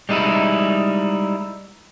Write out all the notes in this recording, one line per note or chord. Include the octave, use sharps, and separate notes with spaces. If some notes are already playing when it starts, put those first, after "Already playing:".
G3 G#3 D#4 E4